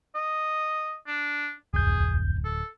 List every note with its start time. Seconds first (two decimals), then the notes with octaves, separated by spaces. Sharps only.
0.15 D#5
1.07 D4
1.74 D1 C2 F2 G#4 G6
2.44 A4